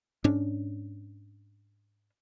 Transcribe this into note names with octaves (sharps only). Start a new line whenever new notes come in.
G#2 C#4 D4